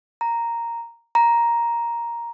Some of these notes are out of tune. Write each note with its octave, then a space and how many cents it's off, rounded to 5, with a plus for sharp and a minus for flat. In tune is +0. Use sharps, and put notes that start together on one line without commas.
A#5 -5
A#5 +5